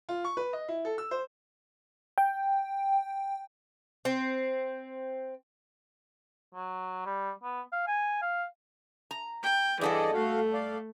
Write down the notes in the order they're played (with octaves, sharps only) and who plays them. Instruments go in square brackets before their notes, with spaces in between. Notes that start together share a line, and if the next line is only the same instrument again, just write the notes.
[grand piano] F4
C#6
B4
D#5
E4
A4
E6
C5
[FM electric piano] G5
[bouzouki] C4
[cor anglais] F#3
G3
B3
F5
G#5
F5
[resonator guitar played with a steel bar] A#5
[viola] G5
[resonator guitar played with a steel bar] G2 A4 F#5 [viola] E3 [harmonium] G#4 D5 D#5
[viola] A3 [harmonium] F#4 F5
[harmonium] D5 F5